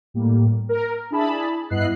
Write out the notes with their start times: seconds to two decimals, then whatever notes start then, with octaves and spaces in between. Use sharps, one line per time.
0.14 A2 G3 A#3
0.69 A#4
1.11 D4 E4 G#4 A5 B5
1.70 G2 B3 E4 D#5 F#6 C7